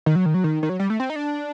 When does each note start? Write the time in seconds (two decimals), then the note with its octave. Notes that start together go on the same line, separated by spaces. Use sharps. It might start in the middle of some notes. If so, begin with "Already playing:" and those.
0.06 D#3
0.16 F#3
0.26 D#3
0.34 F#3
0.44 D#3
0.63 D#3
0.69 F#3
0.80 G3
0.90 A3
1.00 C4
1.10 D#4
1.16 D4